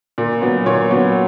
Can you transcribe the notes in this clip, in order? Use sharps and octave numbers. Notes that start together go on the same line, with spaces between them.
A#2
F#3 B3
A#2 C#5
F#3 B3